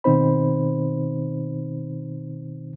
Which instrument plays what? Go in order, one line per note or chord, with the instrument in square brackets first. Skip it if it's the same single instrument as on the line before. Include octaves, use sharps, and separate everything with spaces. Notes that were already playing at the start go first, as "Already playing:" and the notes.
[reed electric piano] B2 D#3 C4 D#4 C5 B5